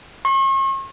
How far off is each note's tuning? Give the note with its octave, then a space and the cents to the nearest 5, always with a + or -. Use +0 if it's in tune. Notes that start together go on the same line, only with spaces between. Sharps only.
C#6 -45